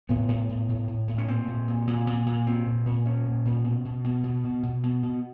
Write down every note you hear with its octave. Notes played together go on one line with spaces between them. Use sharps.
A2 B3
A2
A2
A2
A2
A2
C#4
A#2 C4
A#2
A#2
A#2
A#2
A#2
A#2 C4
A#2
A#2
A#2 C#4
A#2
A#2
B2
B2
B2
B2
B2
B2
B2
B2